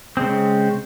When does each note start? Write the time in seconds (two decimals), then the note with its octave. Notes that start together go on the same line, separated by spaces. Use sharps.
0.17 C#3 G#3 C4